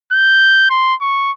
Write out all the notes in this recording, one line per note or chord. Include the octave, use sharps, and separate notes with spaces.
G6
C6
C#6